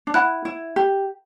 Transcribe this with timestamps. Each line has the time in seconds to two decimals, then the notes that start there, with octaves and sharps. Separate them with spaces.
0.07 D4
0.14 E4 F#5 B5 F#6
0.45 E4
0.76 G4